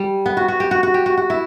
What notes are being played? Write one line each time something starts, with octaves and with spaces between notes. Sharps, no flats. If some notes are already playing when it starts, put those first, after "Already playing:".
Already playing: G3
B3
F#4
F#4
G4
F#4
F#4
G4
F#4
F#4
E4